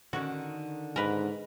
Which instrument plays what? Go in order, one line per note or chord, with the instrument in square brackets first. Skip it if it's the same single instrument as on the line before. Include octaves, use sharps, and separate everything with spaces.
[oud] D3 D#3 C#4 [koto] F#4
[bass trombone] G#2 [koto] A#4 B4